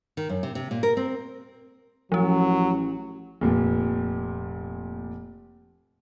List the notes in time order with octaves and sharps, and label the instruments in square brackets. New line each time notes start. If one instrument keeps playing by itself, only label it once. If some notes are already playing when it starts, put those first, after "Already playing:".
[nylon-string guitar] D#3
F#2
C3
C3
A#2
A#4
C4
[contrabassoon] A1 [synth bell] F3 C#4 [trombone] F#3
[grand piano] F1 A#2